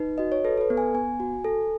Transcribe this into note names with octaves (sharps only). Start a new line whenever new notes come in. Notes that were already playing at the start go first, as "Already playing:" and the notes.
Already playing: D#4 B4
F#4 D#5
C#5
A4 B4
A4
B4
B3
G#5
B3 G#5
F#4
A4